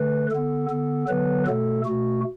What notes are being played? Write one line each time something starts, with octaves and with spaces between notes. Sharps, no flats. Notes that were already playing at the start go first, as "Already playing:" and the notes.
Already playing: D3 A3 B4
D3 B3 A4
D3 B3 A4
D3 F#3 B3 B4
B2 A3 A4
B2 A3 F#4